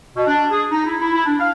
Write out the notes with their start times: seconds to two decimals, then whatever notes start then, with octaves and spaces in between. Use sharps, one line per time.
0.16 B2
0.27 D4
0.51 G#4
0.71 D#4
0.86 E4
0.99 E4
1.15 E4
1.26 D4
1.39 F5